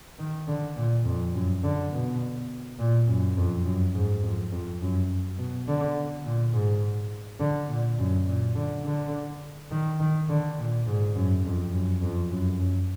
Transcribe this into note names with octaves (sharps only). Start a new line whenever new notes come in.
D#3
D3
A#2
F2
F#2
D3
B2
A#2
F#2
F2
F#2
G#2
F2
F2
F#2
B2
D3
A#2
G#2
D3
A#2
F#2
A#2
D3
D3
D#3
D#3
D3
A#2
G#2
F#2
F2
F#2
F2
F#2
F#2